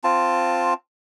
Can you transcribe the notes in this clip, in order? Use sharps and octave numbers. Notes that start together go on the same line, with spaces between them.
C4 F4 A5